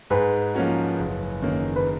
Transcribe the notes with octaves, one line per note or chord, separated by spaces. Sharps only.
G#2 G#4 B4
F3 A#3 C#4 F#4
F#1
F#2 D#3 A#3
B4